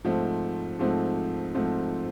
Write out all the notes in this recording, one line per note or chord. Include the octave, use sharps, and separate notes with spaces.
G#2 F3 A3 C4
G#2 F3 A3 C4
G#2 F3 A3 C4